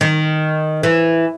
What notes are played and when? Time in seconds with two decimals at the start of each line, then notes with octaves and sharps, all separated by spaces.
0.01 D#3
0.83 E3